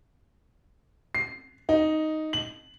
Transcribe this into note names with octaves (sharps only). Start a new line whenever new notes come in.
C7
D#4
F#7